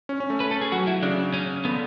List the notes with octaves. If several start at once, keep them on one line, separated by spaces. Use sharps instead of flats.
C#4
C#4
A3
B4
A4
G#4
F#3 F#4
E4
C#3 D4
C#4
D3 B3